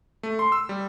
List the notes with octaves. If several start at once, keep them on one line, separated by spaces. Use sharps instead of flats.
A3
C6
E6
G3